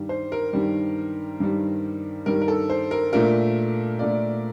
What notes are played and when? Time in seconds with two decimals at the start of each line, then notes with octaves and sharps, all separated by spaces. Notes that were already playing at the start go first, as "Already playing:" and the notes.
Already playing: G2 D#3 G3
0.09 C5
0.32 A#4
0.53 G2 D#3 G3
1.40 G2 D#3 G3
2.26 G2 D#3 G3 A#4
2.41 A#4
2.48 A4
2.70 C5
2.91 A#4
3.13 A#2 A3 D4 F4 A#4
3.99 A#2 A3 D4 F4 D5